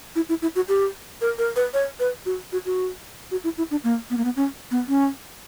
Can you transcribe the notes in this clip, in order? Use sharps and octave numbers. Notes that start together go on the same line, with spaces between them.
E4
E4
E4
F#4
G4
A#4
A#4
B4
C#5
B4
F#4
F#4
F#4
F#4
E4
E4
D4
A#3
B3
A#3
B3
C#4
B3
C#4